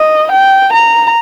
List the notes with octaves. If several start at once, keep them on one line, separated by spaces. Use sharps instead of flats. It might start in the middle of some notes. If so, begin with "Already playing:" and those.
Already playing: D#5
G5
A#5